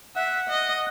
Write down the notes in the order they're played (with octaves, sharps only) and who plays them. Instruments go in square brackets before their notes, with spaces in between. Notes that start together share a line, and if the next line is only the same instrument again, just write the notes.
[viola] E5 [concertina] F#5
[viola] D#5